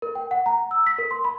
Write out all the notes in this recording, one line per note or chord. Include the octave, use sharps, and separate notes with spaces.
A#4
G5
F#5
A#5
E6
B6
A#4
C6
B5